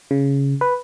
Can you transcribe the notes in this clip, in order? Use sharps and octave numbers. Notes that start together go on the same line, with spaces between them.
C#3
B4